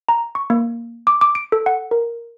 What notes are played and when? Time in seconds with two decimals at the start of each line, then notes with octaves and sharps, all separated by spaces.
0.09 A#5
0.35 C#6
0.50 A#3
1.07 D6
1.21 D6
1.35 D7
1.52 A4
1.66 F#5
1.91 A#4